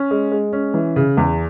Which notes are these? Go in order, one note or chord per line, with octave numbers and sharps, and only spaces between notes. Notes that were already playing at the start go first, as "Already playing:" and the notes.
Already playing: C#4
G#3
G#3
C#4
E3
C#3
E2